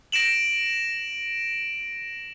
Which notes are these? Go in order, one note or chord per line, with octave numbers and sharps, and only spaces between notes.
A#6 D7 E7 F#7